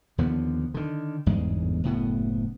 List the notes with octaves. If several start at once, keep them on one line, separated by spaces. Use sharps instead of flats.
D#2 D3 F3 B3
D3 D#3
G1 E2 G#2 G#3
F#1 A2 B3